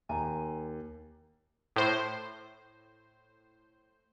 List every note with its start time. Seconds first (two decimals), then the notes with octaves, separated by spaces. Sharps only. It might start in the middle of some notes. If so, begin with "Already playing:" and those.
0.09 D#2 G#5 A#5
1.76 A2 C5